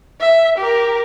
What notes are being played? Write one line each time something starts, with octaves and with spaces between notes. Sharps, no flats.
E5
G4 A#4